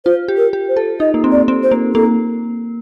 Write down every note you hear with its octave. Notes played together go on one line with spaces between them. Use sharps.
F4 C5
G4
A#4
G4
C5
A4
D#4 D#5
A#3
C4
D5
C4
C5
A#3
A#3 A4